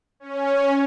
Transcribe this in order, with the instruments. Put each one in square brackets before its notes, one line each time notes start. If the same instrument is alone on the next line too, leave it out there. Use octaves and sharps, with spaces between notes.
[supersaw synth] C#4